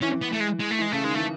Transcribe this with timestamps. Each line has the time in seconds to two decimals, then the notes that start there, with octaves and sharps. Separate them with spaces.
0.02 E3 C#4
0.22 B3
0.33 A3
0.41 G#3
0.60 G#3
0.71 A3
0.79 E3
0.82 G#3
0.92 C#3 A3
1.04 D#3 G#3
1.15 E3 A3